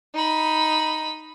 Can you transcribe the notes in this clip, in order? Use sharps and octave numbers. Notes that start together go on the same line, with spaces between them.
D#4 B5